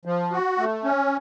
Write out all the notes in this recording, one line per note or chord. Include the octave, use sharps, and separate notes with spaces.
F3
F#4
A3
C#4